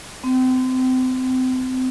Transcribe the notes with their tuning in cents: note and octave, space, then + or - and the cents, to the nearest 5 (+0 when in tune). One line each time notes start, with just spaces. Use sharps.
C4 -30